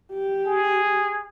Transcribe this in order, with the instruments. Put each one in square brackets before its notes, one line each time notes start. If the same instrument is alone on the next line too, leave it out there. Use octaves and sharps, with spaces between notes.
[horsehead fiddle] G4
[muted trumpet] G#4